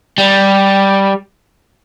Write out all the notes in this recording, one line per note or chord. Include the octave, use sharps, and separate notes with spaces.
G3